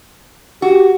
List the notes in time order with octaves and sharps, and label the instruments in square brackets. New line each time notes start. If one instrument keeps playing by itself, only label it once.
[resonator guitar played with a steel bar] F#4 [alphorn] G4